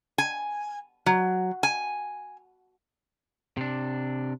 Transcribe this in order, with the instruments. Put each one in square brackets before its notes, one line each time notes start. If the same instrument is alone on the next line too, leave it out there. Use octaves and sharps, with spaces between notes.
[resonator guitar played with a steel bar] G#5
F#3
G#5
[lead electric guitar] C3 D4